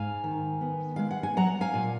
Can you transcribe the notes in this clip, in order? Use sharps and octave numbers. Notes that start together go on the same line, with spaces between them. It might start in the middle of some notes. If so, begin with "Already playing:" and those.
Already playing: G#2 F5 G#5
D#3
B3
G#3 F5
F#5
G#5
F#3 F#5 A#5
F5 G#5
A#2